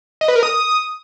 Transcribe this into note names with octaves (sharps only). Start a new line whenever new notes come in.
D#5
B4
A#4
D#6